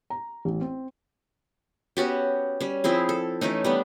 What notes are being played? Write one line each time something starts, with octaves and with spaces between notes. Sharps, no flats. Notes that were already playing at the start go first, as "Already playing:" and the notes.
A#5
A1
C4
B3 C#4 F#4 G4
G3 C#4
F3 C4 E4 G#4
A4
E3 A3 C#4 D#4
G3 B3 D4